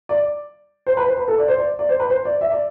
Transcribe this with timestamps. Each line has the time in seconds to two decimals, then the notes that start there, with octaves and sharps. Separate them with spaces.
0.09 D5
0.87 C5
0.97 B4
1.07 C5
1.18 B4
1.28 A4
1.38 D5
1.48 C5
1.58 D5
1.79 D5
1.89 C5
2.00 B4
2.10 C5
2.25 D5
2.41 E5
2.51 D5